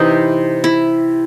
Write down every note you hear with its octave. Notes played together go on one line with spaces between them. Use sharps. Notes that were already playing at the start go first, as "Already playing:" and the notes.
Already playing: C3 E3 C4 D#4
E4